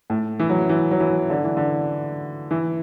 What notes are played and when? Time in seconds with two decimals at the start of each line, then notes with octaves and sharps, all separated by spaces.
0.10 A2
0.39 E3
0.50 F#3
0.69 E3
0.91 F#3
1.00 E3
1.30 D3
1.44 E3
1.57 D3
2.51 E3